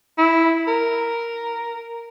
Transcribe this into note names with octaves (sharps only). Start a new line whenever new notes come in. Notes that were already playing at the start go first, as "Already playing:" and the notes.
E4
A#4